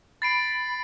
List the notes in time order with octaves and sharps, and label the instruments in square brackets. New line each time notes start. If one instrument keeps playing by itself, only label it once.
[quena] B5 [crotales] A6 C7 D7